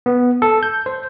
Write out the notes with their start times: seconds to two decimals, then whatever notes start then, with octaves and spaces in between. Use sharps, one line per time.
0.06 B3
0.42 A4
0.63 G6
0.86 C5